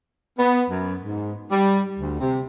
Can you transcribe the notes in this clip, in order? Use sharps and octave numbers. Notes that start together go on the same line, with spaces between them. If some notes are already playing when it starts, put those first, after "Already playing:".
B3
F#2
G#2
G3
D2
C3